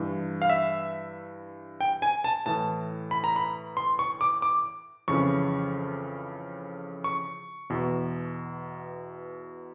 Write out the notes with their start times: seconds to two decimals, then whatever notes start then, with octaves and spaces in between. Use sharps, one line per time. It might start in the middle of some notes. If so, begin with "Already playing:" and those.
Already playing: G2 E3
0.42 F5
0.49 E5
1.81 G5
2.02 G#5
2.24 A5
2.46 A2 E3 A5
3.11 B5
3.24 A#5
3.36 B5
3.77 C6
3.99 C#6
4.21 D6
4.42 D6
5.08 F2 C#3 E3 C#6
7.04 C#6
7.70 E2 B2